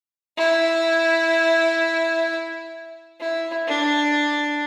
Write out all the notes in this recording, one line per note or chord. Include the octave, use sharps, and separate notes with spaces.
E4
E4
D4